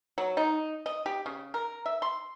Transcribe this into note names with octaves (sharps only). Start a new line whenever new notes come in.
F#3
D#4
D#5
G4
C#3
A#4
E5
C6